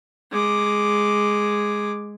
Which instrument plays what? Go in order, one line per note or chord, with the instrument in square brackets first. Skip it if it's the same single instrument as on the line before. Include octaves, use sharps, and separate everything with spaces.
[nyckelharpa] G#3 D6